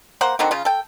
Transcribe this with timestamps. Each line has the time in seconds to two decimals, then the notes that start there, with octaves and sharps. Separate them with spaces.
0.21 A#3 C5 F#5
0.39 D3 D#3 C4 F#4
0.51 C#3 F4
0.65 A4 G5